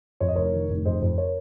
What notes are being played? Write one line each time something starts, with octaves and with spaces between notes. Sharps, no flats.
F2 C#5
D#5
F1 A#4 C#5
D#3
F1
F2 C5 D#5
F2 C5
A#4 C#5